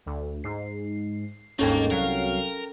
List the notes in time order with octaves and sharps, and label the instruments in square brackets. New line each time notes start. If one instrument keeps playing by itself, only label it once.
[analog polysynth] D2
[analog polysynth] G#2 [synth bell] C7
[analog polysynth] G1 D#2 G#2 [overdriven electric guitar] A#3 [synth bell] C#4 A4 G5
[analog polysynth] C2 F#3 F5 [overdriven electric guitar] A#4